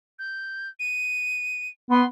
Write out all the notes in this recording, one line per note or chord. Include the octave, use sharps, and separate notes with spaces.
G6
D#7
B3 C6